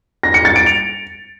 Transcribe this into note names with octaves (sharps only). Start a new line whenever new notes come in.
A#6
C#7
A6
D7
F7